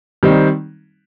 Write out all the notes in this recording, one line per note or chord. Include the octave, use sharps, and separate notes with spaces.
D#3 G3 C4 D#4